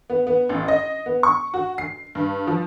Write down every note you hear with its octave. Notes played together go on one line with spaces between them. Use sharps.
B3
B3
A1
D#5
B3
C#6
F#4
C7
G2
F3